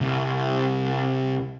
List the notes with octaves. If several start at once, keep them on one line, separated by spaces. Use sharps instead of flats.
C2